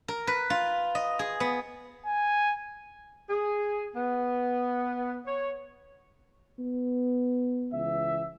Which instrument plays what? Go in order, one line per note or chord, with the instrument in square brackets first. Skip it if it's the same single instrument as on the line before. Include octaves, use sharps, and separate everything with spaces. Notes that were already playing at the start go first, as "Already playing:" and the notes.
[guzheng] A#4
B4
F4
D#5
G#4
B3
[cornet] G#5
[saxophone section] G#4
B3
C#5
[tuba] B3
[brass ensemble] C#2 E3 E5